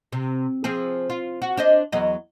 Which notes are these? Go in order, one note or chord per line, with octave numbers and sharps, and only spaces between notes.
C3
F3 C4 G#4
F4
F#4
D4 C5 D#5
E2 F#3 D#5